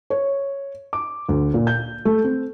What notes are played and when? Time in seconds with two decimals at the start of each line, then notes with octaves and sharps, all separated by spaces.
0.10 C#5
0.93 D6
1.29 D2
1.54 A#2
1.67 G6
2.05 A3
2.24 C4